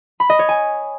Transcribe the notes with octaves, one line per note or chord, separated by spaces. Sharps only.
B5
D#5
C#5
G#5